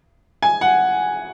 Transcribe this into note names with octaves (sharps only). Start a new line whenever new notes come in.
G#5
F#5